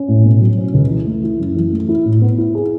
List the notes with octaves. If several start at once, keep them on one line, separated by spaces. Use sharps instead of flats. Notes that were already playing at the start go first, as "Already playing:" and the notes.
Already playing: C#4
A2
B2
F#3
C#4
C#2
E3
A3
E4
F#2
E3
A3
E4
A2
B3
E4
G#4